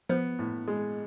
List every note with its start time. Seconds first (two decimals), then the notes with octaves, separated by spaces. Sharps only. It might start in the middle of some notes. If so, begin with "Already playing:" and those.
0.09 F3 B3
0.39 A2
0.68 G#3